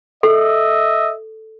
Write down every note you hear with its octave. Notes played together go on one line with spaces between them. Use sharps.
A4 D#5 E5